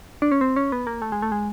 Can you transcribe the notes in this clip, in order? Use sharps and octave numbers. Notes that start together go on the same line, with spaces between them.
D4
C#4
C4
C#4
B3
A#3
A3
G#3
A3
G#3